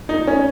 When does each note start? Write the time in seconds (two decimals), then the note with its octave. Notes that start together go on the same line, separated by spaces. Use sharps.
0.09 D#4
0.27 C#4